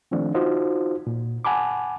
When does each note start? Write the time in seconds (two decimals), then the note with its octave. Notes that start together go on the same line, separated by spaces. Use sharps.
0.11 D#3 F3 A3 C4 D4
0.34 D#4 F4 F#4 C5
1.07 A#2
1.45 F#5 G#5 A5 B5 D6